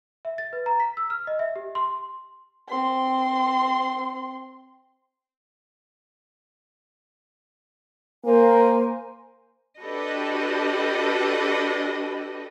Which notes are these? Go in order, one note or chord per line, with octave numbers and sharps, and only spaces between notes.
E5
A6
B4
A#5
B6
E6
F6
D#5
E5
G4
C6
C4 C6
A#3 A#4 C5 G#5
D4 F#4 G4 A4 B4 D#5